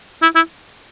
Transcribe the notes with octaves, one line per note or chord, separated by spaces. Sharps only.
E4
E4